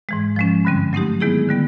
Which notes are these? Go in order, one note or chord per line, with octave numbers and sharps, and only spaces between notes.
G#2 E3 G#3
F3 G#3 C#4
G2 D3 G3 C4
F#3 A3 C4 D#4 G4
D#3 G#3 B3 E4 G#4
D3 G3 B3